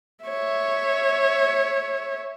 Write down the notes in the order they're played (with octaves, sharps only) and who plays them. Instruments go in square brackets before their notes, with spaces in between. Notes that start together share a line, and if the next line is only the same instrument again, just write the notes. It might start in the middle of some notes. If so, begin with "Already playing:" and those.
[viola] C#5 E5